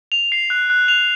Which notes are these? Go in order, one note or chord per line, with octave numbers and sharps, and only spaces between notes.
F7
C7
F#6
F#6
F7